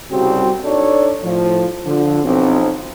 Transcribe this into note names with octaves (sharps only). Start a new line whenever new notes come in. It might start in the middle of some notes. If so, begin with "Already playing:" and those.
C2 C#3 G3 C4 F#4
D4 D#4 A4 C#5 D5
A2 F3
D3 F3
B1 F3 C4